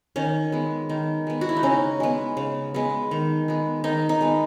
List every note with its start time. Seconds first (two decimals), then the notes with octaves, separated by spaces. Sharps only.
0.16 D#3 C#4
0.52 G#3 B3
0.89 D#3
1.27 G#3 B3
1.41 F#4
1.49 E4
1.57 D#4
1.63 C#3 C#4
2.00 G#3 B3
2.37 C#3
2.74 G#3 B3
3.11 D#3
3.48 G#3 B3
3.84 D#3 D#4
4.09 D#4
4.21 G#3 B3